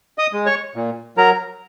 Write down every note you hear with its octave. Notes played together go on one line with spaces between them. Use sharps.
D#5 D#6
G#3
C#5 C#6
A#2
F#3 A#4 A#5